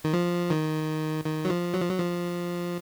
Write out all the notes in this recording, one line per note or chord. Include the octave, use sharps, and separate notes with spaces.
D#3
F3
D#3
D#3
F#3
F3
F#3
F3
F#3
F3